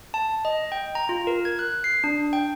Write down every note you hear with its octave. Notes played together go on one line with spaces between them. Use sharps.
A5
D#5
G5
A#5
F4
A#4
G#6
F#6
C7
D4
G5